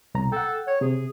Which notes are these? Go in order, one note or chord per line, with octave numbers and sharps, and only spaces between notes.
C2 B2 A#5
A4 F#5 G5
C#5
C3 G#4